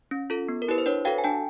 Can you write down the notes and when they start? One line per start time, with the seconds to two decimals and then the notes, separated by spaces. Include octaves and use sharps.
0.11 C#4
0.30 F4 A4
0.48 B3
0.62 A#4
0.68 E4 G4 B4
0.78 C5
0.86 D4 B4 C#5
1.05 F#4 A4 F5 G5
1.18 G#5
1.24 D4 G5 A5